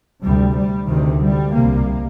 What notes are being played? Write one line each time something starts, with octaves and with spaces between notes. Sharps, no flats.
D2 C3 G3
G3
D2 C3 D#3
G3
C2 C3 A#3